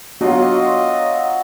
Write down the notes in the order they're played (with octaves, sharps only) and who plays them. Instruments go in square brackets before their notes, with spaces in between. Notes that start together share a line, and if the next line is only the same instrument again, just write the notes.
[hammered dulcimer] F#3 F4 [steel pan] B3 D4 F#4 [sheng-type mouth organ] D#5